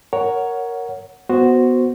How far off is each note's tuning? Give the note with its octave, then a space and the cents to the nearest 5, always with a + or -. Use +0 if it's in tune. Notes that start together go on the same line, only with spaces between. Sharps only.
A#4 +0 C#5 +10 F#5 +0
B3 +0 F#4 +0 C5 +0